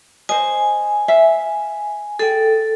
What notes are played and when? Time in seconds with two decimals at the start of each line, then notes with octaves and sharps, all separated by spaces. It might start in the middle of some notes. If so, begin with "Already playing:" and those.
0.29 C5 D#5 G#5
1.08 E5 F5
2.19 G#4 A4 G5